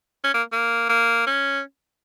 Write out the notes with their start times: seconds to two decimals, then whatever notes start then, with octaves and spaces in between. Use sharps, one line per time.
0.24 C#4
0.34 A#3
0.52 A#3
0.89 A#3
1.27 C#4